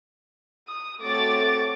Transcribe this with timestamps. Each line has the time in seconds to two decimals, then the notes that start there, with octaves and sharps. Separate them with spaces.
0.68 D#6
1.01 A3 C4 F#4 C#5 D6 A6